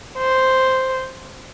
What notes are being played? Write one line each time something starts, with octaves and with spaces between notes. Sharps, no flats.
C5